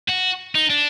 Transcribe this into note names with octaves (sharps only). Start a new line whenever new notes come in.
F#4
D#4
D4